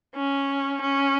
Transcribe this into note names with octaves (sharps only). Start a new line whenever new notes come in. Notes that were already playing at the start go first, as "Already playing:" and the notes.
C#4
C#4